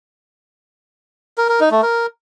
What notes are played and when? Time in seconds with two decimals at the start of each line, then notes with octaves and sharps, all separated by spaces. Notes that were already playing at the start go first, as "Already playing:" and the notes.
1.38 A#4
1.49 A#4
1.60 D#4
1.71 A3
1.83 A#4